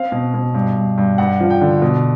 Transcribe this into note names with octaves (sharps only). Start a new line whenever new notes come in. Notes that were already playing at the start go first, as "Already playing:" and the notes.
Already playing: C4 F5
B2
B2
G2
G2
G2
G2 F#5
F3
G5
D3
B2